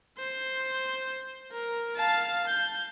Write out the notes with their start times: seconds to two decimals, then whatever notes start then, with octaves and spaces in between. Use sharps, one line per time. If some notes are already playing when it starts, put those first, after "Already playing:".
0.18 C5
1.52 A#4
1.96 F5 A5
2.47 G6